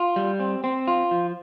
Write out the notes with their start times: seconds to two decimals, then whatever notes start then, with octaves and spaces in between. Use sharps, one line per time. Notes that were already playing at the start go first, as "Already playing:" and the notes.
Already playing: F4
0.16 G3
0.40 C4
0.64 C4
0.87 F4
1.11 F3